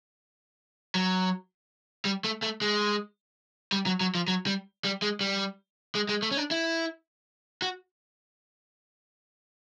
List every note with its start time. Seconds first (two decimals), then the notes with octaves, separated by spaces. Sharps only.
0.95 F#3
2.05 G3
2.24 A3
2.42 A3
2.61 G#3
3.72 G3
3.86 F#3
4.01 F#3
4.15 F3
4.28 F#3
4.47 G3
4.85 G3
5.02 G#3
5.21 G3
5.95 G#3
6.09 G#3
6.23 A3
6.31 C#4
6.37 D4
6.51 E4
7.62 F#4